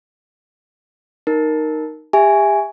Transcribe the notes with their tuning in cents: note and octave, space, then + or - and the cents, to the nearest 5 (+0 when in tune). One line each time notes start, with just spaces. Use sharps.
D#4 -5 A#4 +0
G4 +35 E5 +0 G#5 +0